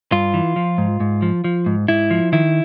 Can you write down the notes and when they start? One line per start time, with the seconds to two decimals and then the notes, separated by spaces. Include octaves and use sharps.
0.12 G2 F4
0.34 E3
0.56 F3
0.78 G#2
1.00 G#2
1.22 F3
1.44 F3
1.66 G#2
1.88 G#2 E4
2.11 F3
2.33 D#3 E4